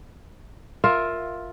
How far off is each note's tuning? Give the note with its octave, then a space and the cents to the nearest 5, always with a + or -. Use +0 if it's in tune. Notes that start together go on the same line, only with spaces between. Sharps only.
F4 +10 A#4 +0 E5 +0